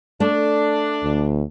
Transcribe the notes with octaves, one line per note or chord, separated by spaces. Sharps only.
A3 D4
D2